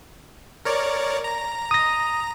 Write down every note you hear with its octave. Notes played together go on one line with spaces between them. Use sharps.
A#4 C#5 D5
A#5
D#6 A#6